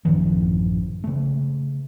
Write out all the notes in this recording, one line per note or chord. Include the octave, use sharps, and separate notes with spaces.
A1 F#2 D#3 F3
C#3 A3